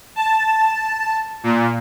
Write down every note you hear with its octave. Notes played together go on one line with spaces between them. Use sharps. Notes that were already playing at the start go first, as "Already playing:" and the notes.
A5
A#2